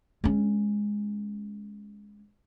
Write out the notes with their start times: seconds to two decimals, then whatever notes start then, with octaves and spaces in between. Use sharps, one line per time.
0.24 G#3 C#4